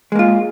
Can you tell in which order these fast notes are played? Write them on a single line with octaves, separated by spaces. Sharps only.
G#3 A#3 F4